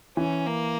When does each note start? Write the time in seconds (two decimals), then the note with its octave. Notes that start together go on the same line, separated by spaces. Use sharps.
0.17 E3 C#4
0.46 A#3